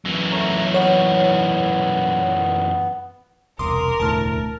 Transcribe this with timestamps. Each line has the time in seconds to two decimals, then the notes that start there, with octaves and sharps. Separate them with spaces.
0.05 F#2 E3
0.32 A3 C#5 A#5
0.74 B3 C#5
3.59 E1 C2 A#4 C6 D6 D#6
4.00 E1 D2 A2 A5 F6